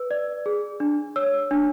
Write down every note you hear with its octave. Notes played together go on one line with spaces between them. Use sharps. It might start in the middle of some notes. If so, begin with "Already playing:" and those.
Already playing: B4 E6
D5
G#4
D4
C#5 E6
D4